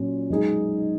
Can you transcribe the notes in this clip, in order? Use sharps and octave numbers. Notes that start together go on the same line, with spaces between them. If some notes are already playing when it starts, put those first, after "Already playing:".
Already playing: A#2 F#3 C#4
B1 B2 G#3 D#4 G#4